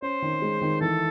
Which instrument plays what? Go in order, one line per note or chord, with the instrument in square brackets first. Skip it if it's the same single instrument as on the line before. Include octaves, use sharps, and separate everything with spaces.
[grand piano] C#4 [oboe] C5
[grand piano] D#3
G#3
D#3
[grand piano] E3 [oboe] A4